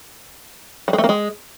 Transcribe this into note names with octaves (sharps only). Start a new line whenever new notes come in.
G3
G#3
A3
A#3
G#3